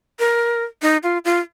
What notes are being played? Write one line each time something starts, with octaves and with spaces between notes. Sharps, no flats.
A#4
D#4
F4
F4